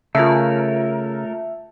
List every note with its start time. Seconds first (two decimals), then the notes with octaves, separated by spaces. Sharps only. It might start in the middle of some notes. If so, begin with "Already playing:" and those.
0.15 C#3 A3 F4 A#4 E5 A5